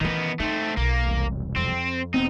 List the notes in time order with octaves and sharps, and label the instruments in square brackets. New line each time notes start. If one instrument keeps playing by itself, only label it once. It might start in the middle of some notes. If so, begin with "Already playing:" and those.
[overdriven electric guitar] D#3 B3 [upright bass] E3 C#4
[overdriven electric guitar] A3 C4 [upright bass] D#4
[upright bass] B1 [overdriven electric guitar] A#3
[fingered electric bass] E1 C2
[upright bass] F2 [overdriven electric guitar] C4
[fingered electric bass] E1 B3 C4 [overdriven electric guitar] D#4